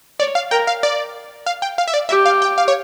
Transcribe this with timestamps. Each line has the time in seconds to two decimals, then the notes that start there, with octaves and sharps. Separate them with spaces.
0.20 C#5 D5
0.35 F5
0.51 A#4 G5
0.67 F5
0.83 D5
1.46 F5
1.62 G5
1.78 F5
1.88 E5
1.94 D5
2.09 G4 E5
2.26 F5
2.42 G5
2.58 F5
2.68 C#5